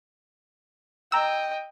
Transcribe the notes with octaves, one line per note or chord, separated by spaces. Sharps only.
D#5 G5 A#5 E6